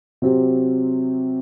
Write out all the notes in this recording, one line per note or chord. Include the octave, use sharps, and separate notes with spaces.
C3 F#3 C4 G4